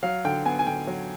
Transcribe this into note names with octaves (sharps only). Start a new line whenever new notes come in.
F#3 F5
D3 G5
B3 G#5
G#5
D3 G5
F#3